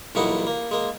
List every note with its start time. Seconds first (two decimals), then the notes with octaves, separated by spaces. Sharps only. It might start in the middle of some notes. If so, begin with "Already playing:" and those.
0.15 B1 A#2 E3 G3 D#4 F#5
0.47 A#3
0.71 G#3 A#3